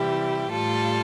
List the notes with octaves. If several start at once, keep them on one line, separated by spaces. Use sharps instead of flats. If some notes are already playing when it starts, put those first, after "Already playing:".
Already playing: C3 E3 G3 E4 G4
A2 G3 F4 A4